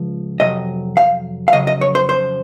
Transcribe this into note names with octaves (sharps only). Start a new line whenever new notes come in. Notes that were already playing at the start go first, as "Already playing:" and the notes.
Already playing: C#2 F3
F2 C3 F#3 D#5
F5
F5
F2 C#3 F#3 D#5
D#5
C#5
C5
C5